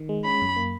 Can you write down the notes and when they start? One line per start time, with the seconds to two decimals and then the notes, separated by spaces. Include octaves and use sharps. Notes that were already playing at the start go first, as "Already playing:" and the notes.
Already playing: D#3
0.09 G#3
0.25 C#4 B5
0.41 F#2
0.56 A#3